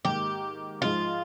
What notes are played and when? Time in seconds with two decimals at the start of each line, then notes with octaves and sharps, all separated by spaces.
0.05 G#2 D#3 A#3 G4
0.81 G#2 F3 G#3 D#4 F4